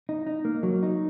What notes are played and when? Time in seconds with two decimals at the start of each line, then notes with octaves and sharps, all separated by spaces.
0.09 D#4
0.27 D#4
0.45 A#3
0.63 F#3
0.83 D#4